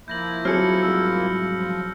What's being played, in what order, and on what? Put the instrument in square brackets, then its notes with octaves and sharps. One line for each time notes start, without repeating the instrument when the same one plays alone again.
[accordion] F3 A#3 E4 [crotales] G6 A#6 F#7
[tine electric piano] F#3 [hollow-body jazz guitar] C4 G#4 A4 [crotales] F6 C#7
[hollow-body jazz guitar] C2 G#2 [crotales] E6
[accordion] F3